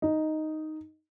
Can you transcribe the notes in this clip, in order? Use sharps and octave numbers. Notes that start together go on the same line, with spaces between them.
D#4